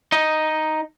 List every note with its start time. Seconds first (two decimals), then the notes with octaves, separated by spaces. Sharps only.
0.12 D#4 D#5